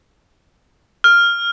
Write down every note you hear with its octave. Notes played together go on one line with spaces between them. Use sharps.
F6